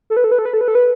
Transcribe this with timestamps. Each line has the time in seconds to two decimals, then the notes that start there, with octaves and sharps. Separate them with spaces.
0.10 A4
0.17 B4
0.24 A4
0.32 B4
0.39 A4
0.45 B4
0.53 A4
0.61 B4
0.68 A4
0.75 B4